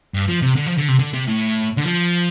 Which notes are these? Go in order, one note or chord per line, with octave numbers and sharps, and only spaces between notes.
G2
F3
C3
D3
F3
D3
C3
D3
C3
A2
D3
F3